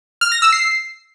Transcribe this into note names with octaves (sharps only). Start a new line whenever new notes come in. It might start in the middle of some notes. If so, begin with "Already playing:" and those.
F6
A#6
E6
C7